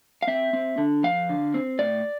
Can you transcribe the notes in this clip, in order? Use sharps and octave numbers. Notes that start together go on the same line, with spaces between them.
F5
C4 E5
C4
D3
F2 F5
D3
C4
A2 D5